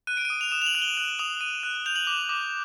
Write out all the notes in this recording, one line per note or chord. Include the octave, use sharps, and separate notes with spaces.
F#6 D#7
D7
D#6 D#7
F7
D#6 E7
F7
F#7
F#6
G7
F#6 F#7
D#6 F7
D#6 D#7
F#6
G6 F7
F#7
D6 F7
D6